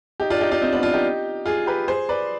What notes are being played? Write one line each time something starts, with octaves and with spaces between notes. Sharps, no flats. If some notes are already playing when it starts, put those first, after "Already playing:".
D#4 G4
D4 F4
D#4 G4
D4 F4
C4 D#4
B3 D4
D4 F4
D#4 G4
F4 G#4
G4 B4
G#4 C5
B4 D5